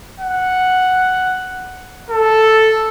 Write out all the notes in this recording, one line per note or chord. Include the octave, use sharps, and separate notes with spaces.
F#5
A4